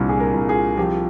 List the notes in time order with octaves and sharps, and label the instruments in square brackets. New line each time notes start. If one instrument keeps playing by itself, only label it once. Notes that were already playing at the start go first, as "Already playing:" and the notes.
Already playing: [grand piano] C2 A#2 F3 D4
G#4
A#4
C2
G#4
F3 G4